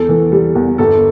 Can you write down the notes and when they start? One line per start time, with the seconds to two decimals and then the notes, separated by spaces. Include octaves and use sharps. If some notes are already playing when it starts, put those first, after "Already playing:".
Already playing: E2 A4
0.09 E3
0.32 G3
0.55 E2
0.78 G1 A4